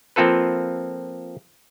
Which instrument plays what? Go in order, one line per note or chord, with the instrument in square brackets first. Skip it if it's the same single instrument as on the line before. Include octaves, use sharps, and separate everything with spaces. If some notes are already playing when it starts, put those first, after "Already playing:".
[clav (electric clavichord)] F3 A#3 C4 F4 A4 B4